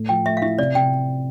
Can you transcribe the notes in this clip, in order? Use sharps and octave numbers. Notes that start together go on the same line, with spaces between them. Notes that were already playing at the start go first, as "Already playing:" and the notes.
Already playing: A2
F3 G5
A3 E5
F5
E4 E5
C3 D5
C3 G5